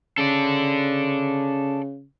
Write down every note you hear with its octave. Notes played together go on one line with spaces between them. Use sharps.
C#3 A4 D5